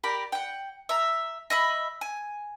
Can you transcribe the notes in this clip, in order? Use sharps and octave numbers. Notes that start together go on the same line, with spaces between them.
G4 A#4 D5 B5
F#5 G5
E5 A#5
D#5 E5 B5
G#5